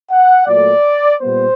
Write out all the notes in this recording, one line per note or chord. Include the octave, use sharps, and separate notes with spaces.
F#5
A#2 F#3 A3 D5
A#2 G3 B3 C5